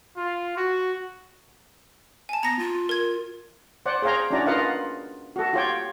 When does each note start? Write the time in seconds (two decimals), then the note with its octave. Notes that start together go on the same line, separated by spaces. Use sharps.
0.17 F4
0.57 F#4
2.29 G#5 A5
2.43 B3 A#5 A#6
2.59 F4
2.89 A#4 G#6
3.86 C5 D5 F#5
4.02 G#4 C5 C#5 F5 G5 A#5
4.30 C#4 D4 E4 F#4 D5 A#5
4.46 F4 A#4 B4 D#5 F5 F#5
5.36 F#4 A4
5.53 F4 G4 C#5 G5